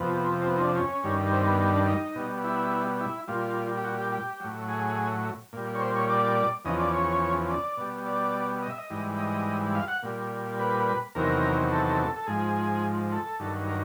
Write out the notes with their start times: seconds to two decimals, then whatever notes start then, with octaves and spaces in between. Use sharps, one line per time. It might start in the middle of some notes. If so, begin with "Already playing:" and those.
Already playing: F2 C3 F3 B3
0.42 C4
0.47 B3
0.56 D#4
0.61 D4
0.76 C#4
1.04 G2 D#3 G3
1.32 C4
1.46 B3
1.60 B3
1.74 D4
1.88 D#4
2.15 B2 G3
2.44 E4
3.01 E4
3.28 A#2 G3 F4
3.77 G4
3.84 F#4
3.98 G4
4.12 G4
4.40 A2 F#3
4.68 G#4
5.53 A#2 G3
5.75 C#5
5.81 C5
5.96 C#5
6.10 D5
6.65 E2 C#3 F3 D#5
6.80 D5
6.94 C#5
7.50 D5
7.77 B2 G3
8.06 D5
8.62 D#5
8.70 E5
8.78 D#5
8.90 G#2 E3 G3
9.18 D#5
9.75 F5
9.88 F#5
10.03 A#2 G3
10.59 B4
11.15 E2 C3 D#3 F#3 A#4
11.71 A4
12.16 A4
12.27 G#2 F3 G#4
13.12 A4
13.40 G2 D#3 F#3
13.68 A#4